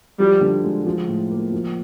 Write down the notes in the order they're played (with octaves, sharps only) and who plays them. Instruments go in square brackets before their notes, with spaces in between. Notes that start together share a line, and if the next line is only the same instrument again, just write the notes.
[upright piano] F3 [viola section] G3
[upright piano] D3
G#3
F3
A2
A#3
F3